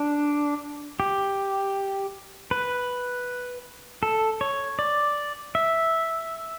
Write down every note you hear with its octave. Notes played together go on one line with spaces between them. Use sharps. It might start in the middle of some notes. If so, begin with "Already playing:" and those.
Already playing: D4
G4
B4
A4
C#5
D5
E5